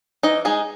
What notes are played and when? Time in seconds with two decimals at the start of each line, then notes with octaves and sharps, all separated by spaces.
0.23 E3 D#4 D#5
0.45 G#3 D#4 G#4